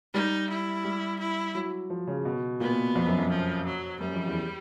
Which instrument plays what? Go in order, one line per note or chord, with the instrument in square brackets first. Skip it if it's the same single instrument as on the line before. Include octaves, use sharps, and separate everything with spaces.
[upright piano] G3 [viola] D#4
[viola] E4
[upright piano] G3
[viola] E4
[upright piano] F#3
F3
C#3
B2
[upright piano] A#2 [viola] B3
[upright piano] F2
F#2
F2
[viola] F3
F#3
[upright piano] F#2 [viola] G3
[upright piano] F2
E2